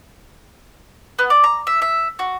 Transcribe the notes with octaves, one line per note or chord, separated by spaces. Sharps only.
B3
D5
A#5
E5
E5
F#4